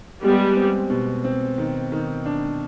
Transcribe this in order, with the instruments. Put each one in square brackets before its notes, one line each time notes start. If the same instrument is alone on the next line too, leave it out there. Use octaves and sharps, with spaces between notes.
[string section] G3 B3 [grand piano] G#3
[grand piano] C4
B2
C4
D#3
D#3
D4